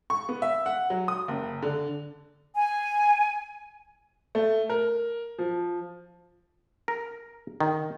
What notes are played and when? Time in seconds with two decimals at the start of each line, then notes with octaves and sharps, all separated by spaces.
0.10 C#6
0.29 B3
0.42 E5
0.66 F#5
0.90 F#3
1.08 D#6
1.28 F#1
1.62 D3
2.56 G#5
4.35 A3
4.69 A#4
5.39 F3
6.88 A#4
7.60 D#3